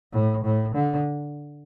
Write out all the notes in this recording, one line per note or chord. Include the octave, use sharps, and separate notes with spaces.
A2
A2
D3